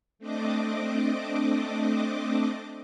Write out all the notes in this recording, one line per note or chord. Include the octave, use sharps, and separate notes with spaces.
A3 C4 D4 D#5 D6